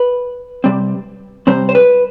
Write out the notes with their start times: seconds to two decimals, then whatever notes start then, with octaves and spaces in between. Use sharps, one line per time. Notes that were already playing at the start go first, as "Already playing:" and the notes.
Already playing: B4
0.64 C3 G3 C4
1.47 C3 G3 C4 C5
1.69 C5
1.75 B4